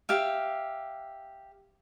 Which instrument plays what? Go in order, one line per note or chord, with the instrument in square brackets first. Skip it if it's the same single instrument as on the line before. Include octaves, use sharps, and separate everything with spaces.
[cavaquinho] G4 E5 F5